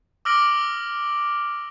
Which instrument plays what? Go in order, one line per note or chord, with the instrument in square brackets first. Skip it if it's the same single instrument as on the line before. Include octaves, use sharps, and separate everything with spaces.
[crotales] D6 E6 F6 A#6 D7 F#7